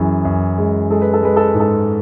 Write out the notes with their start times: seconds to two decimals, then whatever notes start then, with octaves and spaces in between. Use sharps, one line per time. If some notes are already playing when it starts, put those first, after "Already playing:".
Already playing: F#2 E3 G#4
0.25 F#2
0.58 G#3
0.90 G#3 A4
1.02 B4
1.13 A4
1.23 G#3 B4
1.36 A4
1.48 B4
1.54 G#2
1.60 A4